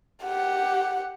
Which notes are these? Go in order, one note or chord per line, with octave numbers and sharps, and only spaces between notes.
G4 F#5